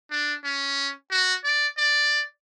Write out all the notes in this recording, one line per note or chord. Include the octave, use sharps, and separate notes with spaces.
D4
C#4
F#4
D5
D5